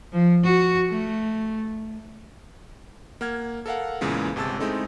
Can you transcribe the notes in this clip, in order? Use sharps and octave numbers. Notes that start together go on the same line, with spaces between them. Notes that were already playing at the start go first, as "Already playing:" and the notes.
F3
F#4
A3
A#3 F#5 F6 G#6
A4 A#4 F5 F#5
E2 A#2 C#3 E3 G#3
G1 C3 G#3 A5 E6 A6
G#3 A3 C4 D#4 E4 A4